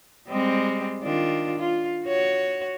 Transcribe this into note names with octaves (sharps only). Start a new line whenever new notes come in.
G3 G#3 C4
D#3 D4 F4
F4
F#4 C#5